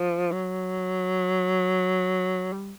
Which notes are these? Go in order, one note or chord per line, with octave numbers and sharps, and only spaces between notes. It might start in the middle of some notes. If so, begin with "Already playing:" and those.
Already playing: F3
F#3
G3